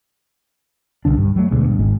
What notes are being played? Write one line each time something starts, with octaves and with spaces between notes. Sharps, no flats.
C2 F2 D3 D4
G2
F#3 A3
D2 B2 G#3
G2
G#1 G#3